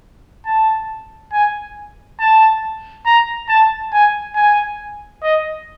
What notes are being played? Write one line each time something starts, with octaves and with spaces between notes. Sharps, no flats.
A5
G#5
A5
A#5
A5
G#5
G#5
D#5